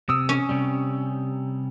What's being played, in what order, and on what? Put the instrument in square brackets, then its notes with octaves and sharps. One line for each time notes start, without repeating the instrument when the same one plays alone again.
[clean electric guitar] C3 [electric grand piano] D#6 E6
[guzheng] C#4
[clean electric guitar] C3 G3